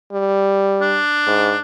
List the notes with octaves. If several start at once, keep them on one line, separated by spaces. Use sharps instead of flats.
G3
D4
G#2